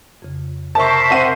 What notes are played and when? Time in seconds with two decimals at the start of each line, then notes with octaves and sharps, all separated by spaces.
0.22 F2 C#3
0.75 C3 A#4 C5 E5 A5 C#6
1.10 C4 F#5 C#6 D6 D#7